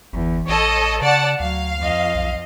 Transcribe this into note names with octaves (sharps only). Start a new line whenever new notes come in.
G1 E2
A1 A4 C#5 D#5
C#3 D5 F#5 A5
D2 F#3 F5
F2 D#5
B1